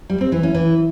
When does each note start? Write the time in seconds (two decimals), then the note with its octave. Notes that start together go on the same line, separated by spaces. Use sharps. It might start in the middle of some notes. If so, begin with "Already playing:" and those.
0.10 G3
0.21 C4
0.32 E3
0.43 C#4
0.54 E3